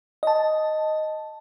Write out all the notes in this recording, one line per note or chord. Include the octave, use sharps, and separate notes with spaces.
D#5 A5